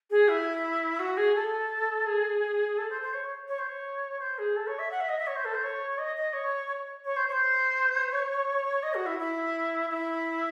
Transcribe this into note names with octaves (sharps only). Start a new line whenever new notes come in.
G#4
E4
F#4
G#4
A4
G#4
A4
C5
C5
C#5
C#5
C5
C#5
C5
G#4
A4
C#5
E5
F#5
E5
D#5
E5
C#5
C5
A4
C5
C#5
D#5
D#5
C#5
C#5
C5
C#5
C5
C#5
D#5
F#4
E4
E4
E4